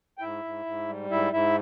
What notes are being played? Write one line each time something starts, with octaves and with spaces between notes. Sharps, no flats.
G5
G#2 E4 E5
G#2
G#2
G3
G#2 E4 E5
G#2 E4 E5